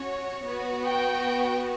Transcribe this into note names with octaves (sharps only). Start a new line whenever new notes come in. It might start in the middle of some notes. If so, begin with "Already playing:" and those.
Already playing: C#4 F#4 C#5
B3 F#4
G5